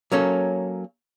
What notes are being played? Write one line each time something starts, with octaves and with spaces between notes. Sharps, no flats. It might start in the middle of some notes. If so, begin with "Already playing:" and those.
F#3 A#3 C#4 A4